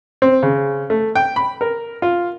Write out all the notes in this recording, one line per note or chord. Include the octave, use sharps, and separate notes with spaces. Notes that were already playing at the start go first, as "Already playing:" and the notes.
C4
C#3
A3
G5
B5
A#4
F4